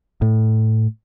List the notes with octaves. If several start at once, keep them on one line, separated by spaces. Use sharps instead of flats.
A2